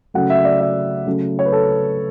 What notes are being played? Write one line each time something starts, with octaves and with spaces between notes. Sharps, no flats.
C#3 F#3 A3 F#5
E5
D5
E5
C#3 F#3 A3
C#5
B4
A4